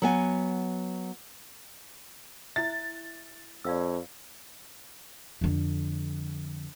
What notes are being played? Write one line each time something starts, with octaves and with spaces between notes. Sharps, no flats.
F#3 B3 G#5
E4 E5 A6
F2 D5 F5 E6
F2 D3